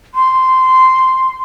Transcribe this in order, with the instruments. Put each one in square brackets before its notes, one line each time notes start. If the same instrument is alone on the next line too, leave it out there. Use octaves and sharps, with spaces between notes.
[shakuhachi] C6